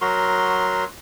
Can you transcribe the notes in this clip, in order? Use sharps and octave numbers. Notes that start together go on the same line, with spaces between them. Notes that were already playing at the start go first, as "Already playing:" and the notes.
F#3 F#4 A#4 C6